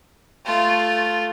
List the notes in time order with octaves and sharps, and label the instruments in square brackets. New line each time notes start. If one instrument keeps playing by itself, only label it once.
[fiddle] A3 F4